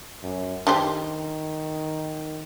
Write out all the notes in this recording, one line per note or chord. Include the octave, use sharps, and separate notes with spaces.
F#2
D#3 D4 G4 C5